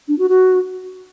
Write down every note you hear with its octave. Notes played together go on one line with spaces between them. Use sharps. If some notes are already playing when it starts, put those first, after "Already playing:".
D4
F#4
F#4